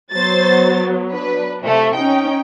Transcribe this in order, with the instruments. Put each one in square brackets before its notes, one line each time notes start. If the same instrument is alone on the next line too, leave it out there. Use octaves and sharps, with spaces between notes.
[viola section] F#3 B3 [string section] C5 A6
[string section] D4 B4
C3 F3 A3
[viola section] C#4 D#4 [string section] G5